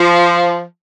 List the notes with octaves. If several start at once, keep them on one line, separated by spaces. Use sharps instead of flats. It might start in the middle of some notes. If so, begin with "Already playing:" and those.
Already playing: F3